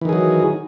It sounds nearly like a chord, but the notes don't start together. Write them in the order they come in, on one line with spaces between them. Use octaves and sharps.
E3 D#3 G#4 F#3